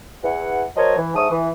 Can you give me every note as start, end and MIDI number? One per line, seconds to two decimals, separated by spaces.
0.24 0.63 40
0.24 0.63 52
0.24 0.63 78
0.76 0.96 54
0.76 0.96 69
0.76 0.96 70
0.76 0.96 72
0.76 0.96 73
0.76 0.96 75
0.97 1.14 52
1.15 1.28 44
1.15 1.28 69
1.15 1.28 76
1.15 1.28 85
1.15 1.28 87
1.30 1.50 52